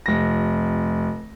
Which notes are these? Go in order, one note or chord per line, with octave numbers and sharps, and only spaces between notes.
F1 A#6